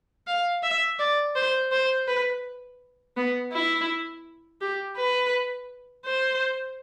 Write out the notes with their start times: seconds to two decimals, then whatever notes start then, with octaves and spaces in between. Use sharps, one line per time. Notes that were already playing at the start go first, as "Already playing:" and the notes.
0.27 F5
0.63 E5
0.99 D5
1.36 C5
1.72 C5
2.08 B4
3.17 B3
3.52 E4
4.61 G4
4.97 B4
6.06 C5